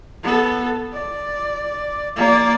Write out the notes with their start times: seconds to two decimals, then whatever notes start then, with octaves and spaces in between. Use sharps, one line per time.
0.23 B3 A4
0.93 D5
2.16 A#3 D5